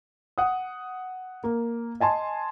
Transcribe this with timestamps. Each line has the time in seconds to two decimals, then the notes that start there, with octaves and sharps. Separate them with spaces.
0.38 F#5 D#6
1.44 A#3
2.00 D#5 G#5 A5 C6